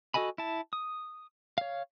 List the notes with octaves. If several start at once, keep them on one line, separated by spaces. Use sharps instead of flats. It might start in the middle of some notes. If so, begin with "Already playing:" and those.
F#4 A4 D#5 G#5 B5
E4 A5
D#6
C#5 F5